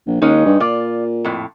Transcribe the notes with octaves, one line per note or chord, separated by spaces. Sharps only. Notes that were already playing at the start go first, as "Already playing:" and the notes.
A#1
D#2 G#3 C#4 D#4
G2
A#2 F4 D5
F2 A2